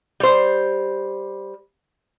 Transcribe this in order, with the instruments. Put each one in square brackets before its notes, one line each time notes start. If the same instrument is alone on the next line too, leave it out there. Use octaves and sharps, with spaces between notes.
[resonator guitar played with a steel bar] G3 C5